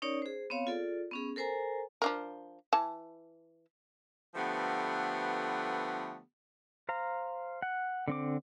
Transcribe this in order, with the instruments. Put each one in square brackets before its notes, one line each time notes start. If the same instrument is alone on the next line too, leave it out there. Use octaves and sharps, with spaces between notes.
[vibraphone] C#4 D#4 A#4 C#5 D5
G#4 C5
B3 C4 C#5 F5
F4 G#4 A4 D5
B3 C#4 G#4
A4 A#4 C5 G#5 A#5
[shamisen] F3 D4 A#4
E3 A5
[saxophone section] D3 F3 A3 B3 G4 B4
[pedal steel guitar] C5 F5 A#5
F#5
D3 C4 D6